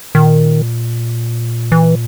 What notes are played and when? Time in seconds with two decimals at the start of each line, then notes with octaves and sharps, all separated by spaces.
0.14 A#2 D#3
1.72 E3